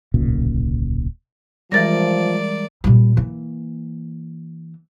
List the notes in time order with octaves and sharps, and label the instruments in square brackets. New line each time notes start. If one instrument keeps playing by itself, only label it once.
[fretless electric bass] D1 B1 A#2 C#3
[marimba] E3 A6 A#6 [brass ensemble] F3 [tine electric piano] G3 G#3 A#4 [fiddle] D5
[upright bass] A#2 G3
E3 A#3